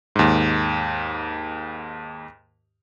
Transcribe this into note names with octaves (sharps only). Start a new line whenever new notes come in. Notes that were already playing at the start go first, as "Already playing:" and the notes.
D#2 G#2